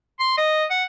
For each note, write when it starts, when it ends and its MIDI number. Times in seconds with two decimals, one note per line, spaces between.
0.20 0.34 84
0.38 0.65 75
0.70 0.84 78